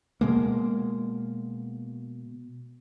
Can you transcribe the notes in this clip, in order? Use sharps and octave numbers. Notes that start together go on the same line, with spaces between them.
B2 G#3 A#3